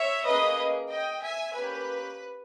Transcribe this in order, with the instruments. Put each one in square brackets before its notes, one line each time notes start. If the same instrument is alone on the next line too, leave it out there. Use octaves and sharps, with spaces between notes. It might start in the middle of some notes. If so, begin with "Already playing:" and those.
Already playing: [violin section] C#5 E5
A#3 C#4 G#4 B4 D#5
D#5 G5
E5 G#5
A#3 C#4 G4 B4